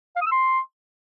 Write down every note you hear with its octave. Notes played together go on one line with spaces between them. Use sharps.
F5
D#6
E6
C6